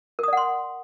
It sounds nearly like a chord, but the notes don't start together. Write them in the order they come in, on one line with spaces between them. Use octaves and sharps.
A#4 D#6 D5 F#5 C6